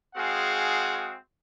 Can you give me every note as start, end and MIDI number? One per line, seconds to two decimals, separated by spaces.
0.15 1.15 56
0.15 1.15 60
0.15 1.15 66
0.15 1.15 68
0.15 1.15 77